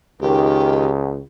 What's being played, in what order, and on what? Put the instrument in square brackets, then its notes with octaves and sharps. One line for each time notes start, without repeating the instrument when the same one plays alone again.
[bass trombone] C#2 [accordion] D#3 [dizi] G4